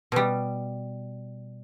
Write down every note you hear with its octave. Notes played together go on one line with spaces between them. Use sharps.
B2 G3